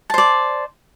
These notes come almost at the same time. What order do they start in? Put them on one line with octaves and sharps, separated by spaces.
A5 C5 D5